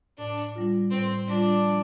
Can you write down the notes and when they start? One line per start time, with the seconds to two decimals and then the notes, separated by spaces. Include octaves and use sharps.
0.18 A2 D4
0.56 G3 F4
0.91 A2 C4
1.28 G3 D4 F4
1.64 F3